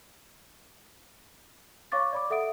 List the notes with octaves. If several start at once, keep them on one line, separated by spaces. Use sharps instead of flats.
C#5 F5 C#6 D6 A6
D5 B5 D6
A4 E5 F#5 D#6 D7